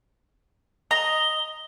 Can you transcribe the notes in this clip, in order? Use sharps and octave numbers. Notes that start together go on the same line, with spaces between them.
D#5 A#5 G7